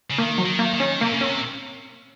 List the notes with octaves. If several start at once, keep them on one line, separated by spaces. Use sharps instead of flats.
C#3
D#3 A#3
F#3
D#3
A#3
D#3
C#4
C3 A#3
C#3
C3 C#4